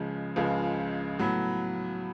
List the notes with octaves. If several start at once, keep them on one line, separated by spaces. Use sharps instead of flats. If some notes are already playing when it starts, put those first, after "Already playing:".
Already playing: C#2 C#3 F3 G#3
C#2 C#3 F3 G#3
A2 F#3 B3